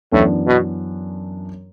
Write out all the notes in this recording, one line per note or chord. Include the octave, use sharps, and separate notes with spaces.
F#2 A2 E3 B3 D4
B2